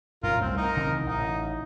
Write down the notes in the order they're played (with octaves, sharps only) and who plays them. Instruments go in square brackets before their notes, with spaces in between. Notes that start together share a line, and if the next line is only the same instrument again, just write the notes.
[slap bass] F#2 A2 [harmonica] F4 A#4
[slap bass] C2 A3 [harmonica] C4
[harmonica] D#4 A#4
[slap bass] C#3 E3 C4
[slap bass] A1 [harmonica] D#4